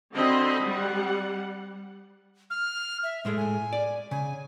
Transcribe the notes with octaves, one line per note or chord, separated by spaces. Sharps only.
D3 C4 F#4 C5 D#5 B5
G3 F#5
F6
E5
A2 G#3 A3 G#4
G#5
D5
C#3 G#5